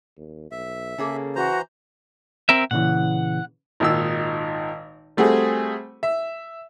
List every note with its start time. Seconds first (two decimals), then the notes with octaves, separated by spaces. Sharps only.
0.17 D#2
0.51 B1 E5
0.98 C#3 A#3 G#4 A4
1.36 E3 F#4 C5 A#5
2.49 C4 A#4 E5
2.71 A#2 C#3 E3 F#5
3.80 G#1 A#2 D#3 D#4 E6
5.17 G3 A3 C4 F#4 G#4
6.03 E5